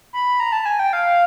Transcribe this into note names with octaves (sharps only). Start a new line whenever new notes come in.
B5
A#5
A5
G#5
G5
F5